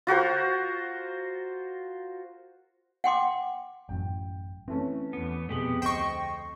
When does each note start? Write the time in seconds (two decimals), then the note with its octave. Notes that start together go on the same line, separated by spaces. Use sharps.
0.07 F4 F#4 A#4 C5
3.04 F#5 G5 C6 D6
3.89 A1 F#2 A2 G5
4.68 E3 A3 C4 C#4
5.13 E2 B3
5.49 F2 B2 A3 B3 G4 G#4 F#7
5.82 D2 C5 D#5 G5 C#6